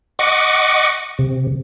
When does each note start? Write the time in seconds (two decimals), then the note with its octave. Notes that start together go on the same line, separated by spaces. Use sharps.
0.19 D#5 F#5 C#6 D6
1.19 C3